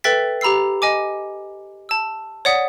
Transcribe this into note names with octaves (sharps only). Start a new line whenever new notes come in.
A4 B4 E5 G5 A6 B6
G4 A#5 B5 E6 C7
D#5 G#5 D6
A5 E6
C#5 D5 F#5 D#6 B6